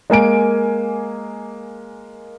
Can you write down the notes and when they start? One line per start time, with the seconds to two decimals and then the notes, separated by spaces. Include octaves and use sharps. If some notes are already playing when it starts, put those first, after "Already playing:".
0.10 G#3 A#3 G#5 D7